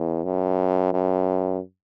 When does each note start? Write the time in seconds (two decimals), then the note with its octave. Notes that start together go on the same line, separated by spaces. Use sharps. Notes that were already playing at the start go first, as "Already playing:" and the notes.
Already playing: E2
0.24 F#2
0.93 F#2